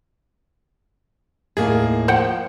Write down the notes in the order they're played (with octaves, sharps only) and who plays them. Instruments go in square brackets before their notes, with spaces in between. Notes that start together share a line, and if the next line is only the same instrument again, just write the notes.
[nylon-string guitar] D#2 A2 [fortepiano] A#3 G#4
[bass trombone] F3 [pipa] C5 F#5 G5